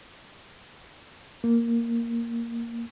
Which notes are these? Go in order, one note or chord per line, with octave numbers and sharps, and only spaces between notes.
A#3